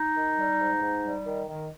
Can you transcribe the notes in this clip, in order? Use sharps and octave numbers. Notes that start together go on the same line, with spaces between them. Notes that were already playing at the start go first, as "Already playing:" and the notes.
Already playing: D#4
D#3
G3
G#2
G#2
G3
D#3
D#3